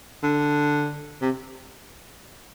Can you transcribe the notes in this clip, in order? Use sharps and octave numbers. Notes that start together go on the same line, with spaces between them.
D3
C3